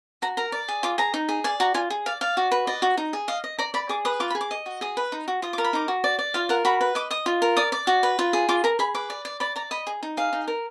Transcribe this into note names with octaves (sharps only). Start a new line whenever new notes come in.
F#4 A#5
A#4 A#5
D5
G#4
F4 D6
G#4 A#5
D#4
G#4
D5 G#5
F#4 A#5
F4 G#5
G#4
D5 F5
D5 F5
F#4
B4
D5 D#5
F#4
D#4
G#4
D#5 F5
D#5
D5 A#5
D5 B5
G#4 D6
B4 D#6
F4 D6
B5
G#4
D6
D#5
F#4
G#4 D#6
B4
D#4
F#4
F4 D#6
A#4 D6
B5
D#4 D6
F#4
D5
D5
F4 F5
A#4 F#5
F#4 B5
B4
D#5 D6
D#5 D#6
F4
A#4
D5 D#6
D5 D6
F#4
B4
F4
G#4
F4 D6
A#4 A#5
G#4 B5
B4 D6
D5
D5
D5 B5
D5 A#5
D#5 B5
G#4
D#4
G#4 F5
D#4
A#4